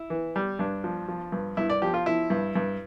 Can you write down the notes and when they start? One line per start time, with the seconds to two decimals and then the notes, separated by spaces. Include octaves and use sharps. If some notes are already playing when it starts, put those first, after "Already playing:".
Already playing: E4
0.10 E3
0.36 G3
0.59 G2 D4
0.84 F3
1.08 F3
1.32 G2
1.57 G2 E4
1.70 D5
1.82 F3 G4
1.94 F4
2.06 F3 E4
2.30 G2
2.56 G2